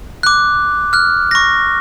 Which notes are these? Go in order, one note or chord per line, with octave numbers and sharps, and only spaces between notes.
D6 F#6
F6 F#6
C#6 A#6